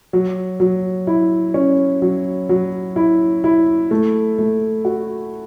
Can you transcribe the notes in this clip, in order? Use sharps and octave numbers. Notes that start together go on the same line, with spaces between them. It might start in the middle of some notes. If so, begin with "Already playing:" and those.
F#3
F#3
E4
C#4
F#3
F#3
E4
E4
A3
A3
F#4